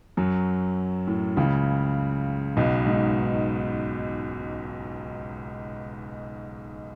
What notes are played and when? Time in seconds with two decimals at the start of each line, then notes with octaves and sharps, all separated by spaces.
0.17 F#2 F#3
1.07 A2
1.37 C#2 C#3
2.57 B1 B2
2.86 G#2